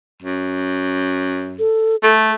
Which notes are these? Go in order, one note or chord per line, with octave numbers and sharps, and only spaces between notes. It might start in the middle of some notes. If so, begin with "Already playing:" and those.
F#2
A4
A3 A4